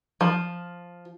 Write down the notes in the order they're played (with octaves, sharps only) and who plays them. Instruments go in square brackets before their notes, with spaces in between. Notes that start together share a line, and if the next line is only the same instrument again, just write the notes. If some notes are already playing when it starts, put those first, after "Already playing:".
[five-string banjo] F3